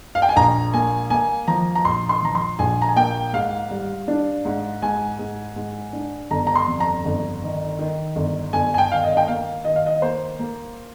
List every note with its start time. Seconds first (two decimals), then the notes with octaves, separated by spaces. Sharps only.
0.15 F5
0.22 G5
0.29 G#5
0.36 A#1 A#5
0.73 A#3 G#5
1.10 A#3 G#5
1.47 F3 A#5
1.75 A#5
1.85 A#1 C6
2.09 C6
2.22 F3 A#5
2.35 C6
2.59 A#1 G#5
2.82 A#5
2.89 G#5
2.96 A#3 G5
3.33 G#2 F5
3.71 G3
4.08 D4
4.45 G#2
4.82 G#2 G#5
5.19 G#2
5.56 G#2
5.93 D4
6.31 G1 A#5
6.47 A#5
6.55 C6
6.68 F2
6.80 A#5
7.05 G1
7.42 D#3
7.79 D#3
8.16 G1
8.53 G1 G#5
8.74 G#5
8.78 G5
8.91 D#3 F5
9.03 D#5
9.17 G5
9.28 A#3 F5
9.64 D#3 D#5
9.76 F5
9.86 D#5
10.02 A#3 C5
10.39 A#3